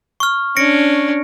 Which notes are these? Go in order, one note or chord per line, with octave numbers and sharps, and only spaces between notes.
C#6 F6
C#4 D4 A#6 C#7 D7